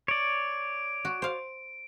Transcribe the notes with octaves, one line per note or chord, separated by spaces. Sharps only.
C#5 D5 D7
F#4
C5 F5